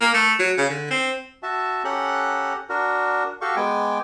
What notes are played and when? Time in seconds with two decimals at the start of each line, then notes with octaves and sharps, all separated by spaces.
0.01 A#3
0.14 A3
0.39 F#3
0.58 C#3
0.69 D3
0.90 C4
1.43 F#4 E5 A5
1.84 C#4 G4 A4 F#5 A#5 F#6
2.69 D4 F#4 A#4
3.41 F#4 G4 A4 F5 C#6
3.56 G#3 B3 G5 G#5 D6